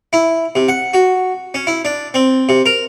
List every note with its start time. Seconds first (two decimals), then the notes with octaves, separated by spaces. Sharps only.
0.13 E4
0.55 C3
0.69 F#5
0.94 F#4
1.54 C#4
1.67 E4
1.85 D4
2.14 C4
2.49 C3
2.66 A#4